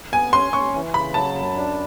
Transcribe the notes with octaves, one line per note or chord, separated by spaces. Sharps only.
B3 G#5
C#4 C6
C#4 C#6
E3
C#3 B5
F#3 A5
F#2
D4